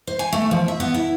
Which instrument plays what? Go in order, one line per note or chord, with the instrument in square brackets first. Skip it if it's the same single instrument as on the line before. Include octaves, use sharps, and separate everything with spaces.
[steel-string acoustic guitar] C5
G#5
A3
F3
E5
B3
E4